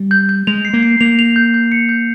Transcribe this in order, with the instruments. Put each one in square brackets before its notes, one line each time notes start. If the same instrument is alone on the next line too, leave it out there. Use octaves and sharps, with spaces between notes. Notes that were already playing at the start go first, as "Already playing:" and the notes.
Already playing: [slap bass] G3
[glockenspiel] G6
G6
[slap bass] G#3 [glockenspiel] F7
[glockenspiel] C7
[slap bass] A#3
[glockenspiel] C7
[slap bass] A#3 [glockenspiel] F7
[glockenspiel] F7
G6
G6
C#7
G6